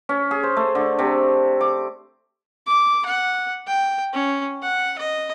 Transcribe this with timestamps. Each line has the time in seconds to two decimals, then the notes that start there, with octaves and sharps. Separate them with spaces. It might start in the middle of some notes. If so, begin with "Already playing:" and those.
0.09 C#4
0.31 G#4
0.43 C5
0.57 A3
0.75 D3
0.99 C3
1.61 D6
2.67 D6
3.05 F#5
3.68 G5
4.13 C#4
4.63 F#5
4.98 D#5